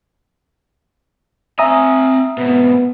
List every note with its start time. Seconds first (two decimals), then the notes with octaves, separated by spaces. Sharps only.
1.59 C4 E5 G#5 A#5 D#6
2.38 G#2 B2 B3